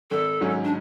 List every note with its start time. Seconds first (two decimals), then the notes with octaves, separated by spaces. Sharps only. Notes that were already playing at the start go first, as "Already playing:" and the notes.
0.11 G#1 A4
0.41 G#2 F#3 C#4
0.64 D4